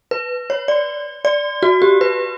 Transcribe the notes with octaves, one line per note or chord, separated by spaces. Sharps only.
B4
C#5
D5
D5
F#4
G4
B4